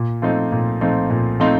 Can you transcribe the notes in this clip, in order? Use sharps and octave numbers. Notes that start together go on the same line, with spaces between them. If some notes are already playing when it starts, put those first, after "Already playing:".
Already playing: A#2
F3 A3 C4 D#4
A#2
F3 A3 C4 D#4
A#2
F3 A3 C4 D#4